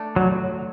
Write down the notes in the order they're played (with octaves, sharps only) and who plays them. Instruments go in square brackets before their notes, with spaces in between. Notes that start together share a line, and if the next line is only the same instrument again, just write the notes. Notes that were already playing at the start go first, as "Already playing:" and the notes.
Already playing: [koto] A3 D4 A4
[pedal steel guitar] F#3